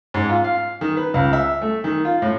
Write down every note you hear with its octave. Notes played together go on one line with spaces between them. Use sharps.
G#2
F4
F5
D#3
B4
C#2
E5
A3
D#3
F4
A2